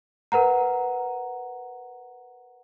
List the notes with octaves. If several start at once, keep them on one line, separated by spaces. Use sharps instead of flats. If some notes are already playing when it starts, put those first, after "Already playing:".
A#4 B4 F#5 A#5